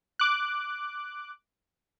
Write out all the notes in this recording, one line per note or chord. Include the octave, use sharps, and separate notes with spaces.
D6 F#6